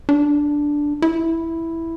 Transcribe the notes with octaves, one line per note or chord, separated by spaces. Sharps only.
D4
E4